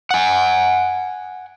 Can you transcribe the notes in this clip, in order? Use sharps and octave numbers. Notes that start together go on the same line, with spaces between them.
F#5 G#5